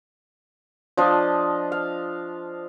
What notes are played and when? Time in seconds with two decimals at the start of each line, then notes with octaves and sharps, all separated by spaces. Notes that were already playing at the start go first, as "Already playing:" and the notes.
0.97 F3 D4 F4 D#5
1.72 F5